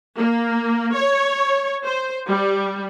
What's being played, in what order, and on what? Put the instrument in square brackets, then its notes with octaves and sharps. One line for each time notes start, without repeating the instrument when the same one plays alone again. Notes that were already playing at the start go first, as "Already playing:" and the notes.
[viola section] A#3
C#5
C5
G3